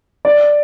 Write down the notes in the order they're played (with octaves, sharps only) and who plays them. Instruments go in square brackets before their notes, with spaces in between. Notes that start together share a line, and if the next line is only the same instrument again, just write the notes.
[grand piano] D5